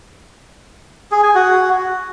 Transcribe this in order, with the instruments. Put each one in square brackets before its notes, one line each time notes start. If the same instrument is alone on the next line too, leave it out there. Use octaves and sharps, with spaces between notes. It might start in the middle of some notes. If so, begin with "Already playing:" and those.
[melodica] G#4
G#5
F#4